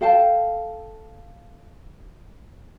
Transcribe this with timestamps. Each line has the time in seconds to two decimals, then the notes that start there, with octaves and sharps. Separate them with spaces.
0.01 A4 F5 G5 A5